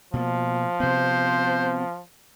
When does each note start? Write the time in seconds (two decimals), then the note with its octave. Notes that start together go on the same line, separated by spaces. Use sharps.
0.14 B2 F3 A#3
0.80 C3 B3 C5